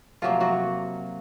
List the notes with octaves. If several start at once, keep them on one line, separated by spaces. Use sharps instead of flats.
C3 F3 F#3 A#3 F4
F#3 F#4